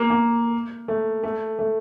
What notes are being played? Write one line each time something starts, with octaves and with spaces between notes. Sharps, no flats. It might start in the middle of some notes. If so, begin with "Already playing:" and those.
Already playing: A#3
A#3
A3
A3
A3